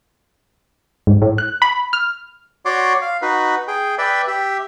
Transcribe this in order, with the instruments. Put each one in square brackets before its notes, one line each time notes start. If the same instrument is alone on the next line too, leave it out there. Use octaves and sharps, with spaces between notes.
[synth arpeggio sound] G#2
A2
F#6
B5
F6
[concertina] F#4 C#5 D5 C6 D6
F5
D#4 F#4 B4
G#4 G5
B4 D5 E5 G5
G4 E5